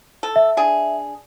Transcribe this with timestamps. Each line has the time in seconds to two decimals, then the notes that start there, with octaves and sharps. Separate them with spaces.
0.23 A4
0.36 E5
0.57 D4 G#4